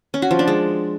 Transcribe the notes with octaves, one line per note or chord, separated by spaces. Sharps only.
C#4
F#4
F3
D4
G#3